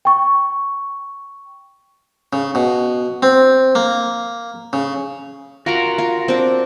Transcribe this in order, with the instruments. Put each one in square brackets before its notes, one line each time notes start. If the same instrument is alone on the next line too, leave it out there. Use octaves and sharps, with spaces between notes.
[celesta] G5 C#6
[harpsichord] C#3
B2
C4
A#3
C#3
[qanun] F4 A#5 [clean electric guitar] F#4 A#4
[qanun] F4
C4 D4